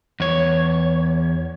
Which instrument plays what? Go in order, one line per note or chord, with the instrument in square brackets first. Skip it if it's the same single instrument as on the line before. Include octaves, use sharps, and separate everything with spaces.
[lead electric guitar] E2 C#5